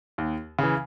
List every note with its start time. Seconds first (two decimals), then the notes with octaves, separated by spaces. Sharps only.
0.18 D#2
0.59 C#3 E3